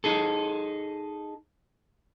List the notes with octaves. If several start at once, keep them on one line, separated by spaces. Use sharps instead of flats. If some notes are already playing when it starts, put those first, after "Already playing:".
D#4 G#4 A4